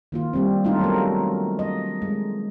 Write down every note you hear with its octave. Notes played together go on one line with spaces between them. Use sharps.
D#3 A#3 F4
G3 C4
A3 D4 D#4 F4
F#3 A3 B3 A#4
D#5
G#3